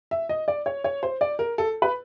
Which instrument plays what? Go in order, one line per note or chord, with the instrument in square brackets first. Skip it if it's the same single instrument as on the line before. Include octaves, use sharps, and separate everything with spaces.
[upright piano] E5
D#5
D5
C#5
C#5
C5
D5
A#4
A4
B4